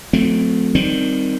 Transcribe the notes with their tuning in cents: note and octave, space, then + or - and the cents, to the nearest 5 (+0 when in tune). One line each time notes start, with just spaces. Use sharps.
F#3 -45 A3 +0 C4 -25
D#3 +0 G3 +0 C4 +0